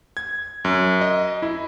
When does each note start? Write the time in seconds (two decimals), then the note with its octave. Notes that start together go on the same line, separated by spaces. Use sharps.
0.17 G#6
0.65 F#2
1.01 D#5
1.42 E4